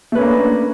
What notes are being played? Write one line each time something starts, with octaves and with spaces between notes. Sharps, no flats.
A3 A#3 C#4 D4 B4